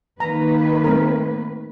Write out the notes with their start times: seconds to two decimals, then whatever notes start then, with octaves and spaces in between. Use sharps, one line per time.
0.20 D#3 A#3 B4 A#5
0.84 A3 C4 A#4